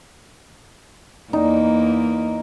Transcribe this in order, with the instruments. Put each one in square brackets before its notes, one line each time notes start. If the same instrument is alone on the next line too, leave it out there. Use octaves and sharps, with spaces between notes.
[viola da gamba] E2 A#3 [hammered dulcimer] D#4